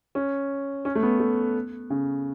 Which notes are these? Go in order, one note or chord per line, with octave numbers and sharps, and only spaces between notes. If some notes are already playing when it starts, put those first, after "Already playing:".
C#4
C#4
A3
B3
A3
C#3